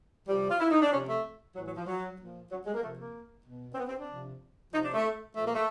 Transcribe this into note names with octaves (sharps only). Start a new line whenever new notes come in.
C3 F3 G3
F4
E4
D#4
D4
C3 F3 C#4
A3
A2 E3 F#3
F#3
F3
F#3
A#2 F3
F#3
G#3
A#3
C3 F3 A3
A#3
B2
C4
B3
C4
D4
C3 F3
C3 F3 D#4
D4
A3
A#2 F3 A3
A#3
A3